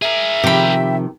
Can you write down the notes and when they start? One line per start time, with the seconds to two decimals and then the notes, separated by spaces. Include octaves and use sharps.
0.02 G#4 A#4 E5
0.44 C3 D#3 F3 G4 B5